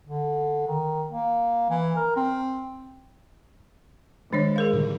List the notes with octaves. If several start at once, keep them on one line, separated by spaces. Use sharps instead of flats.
D3
D#3
A#3
E3
A#4
C4
D#3 G#3 D4 C#5
G#4 A#4 F5
A2 D3 G3